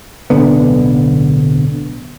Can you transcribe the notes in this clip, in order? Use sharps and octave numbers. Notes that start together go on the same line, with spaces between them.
D1 B1 D3 B3